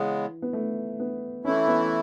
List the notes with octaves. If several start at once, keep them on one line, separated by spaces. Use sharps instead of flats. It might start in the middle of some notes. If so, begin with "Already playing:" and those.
Already playing: C#3 E3 G#3 B3
B3
A3
B3
E3 A3 C#4 E4
B3